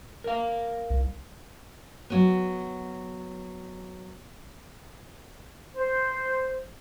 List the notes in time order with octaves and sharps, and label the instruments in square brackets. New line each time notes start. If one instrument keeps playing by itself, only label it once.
[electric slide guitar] A#4 F5
[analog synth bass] C2
[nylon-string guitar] F#3 B3
[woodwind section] C5